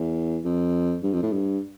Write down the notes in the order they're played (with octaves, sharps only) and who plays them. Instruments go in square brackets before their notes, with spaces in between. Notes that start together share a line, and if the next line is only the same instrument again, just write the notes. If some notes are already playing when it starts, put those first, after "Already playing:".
Already playing: [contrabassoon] E2
F2
G2
F2
A2
G2